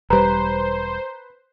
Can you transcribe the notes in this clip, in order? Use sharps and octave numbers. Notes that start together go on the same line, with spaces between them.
E1 G3 B4 C5 A#5